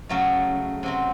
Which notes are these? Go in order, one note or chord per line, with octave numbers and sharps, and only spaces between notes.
C#3 F#3 A3
C3 F#3 C4